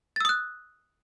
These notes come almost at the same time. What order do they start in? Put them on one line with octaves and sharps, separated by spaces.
A6 E6 D#6 F#6